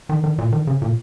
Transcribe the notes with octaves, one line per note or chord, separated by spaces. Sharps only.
D#3
D#3
A#2
D#3
C#3
A#2